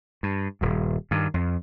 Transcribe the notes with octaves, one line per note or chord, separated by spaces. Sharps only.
G2
D#1 G2
G2 D#3
F2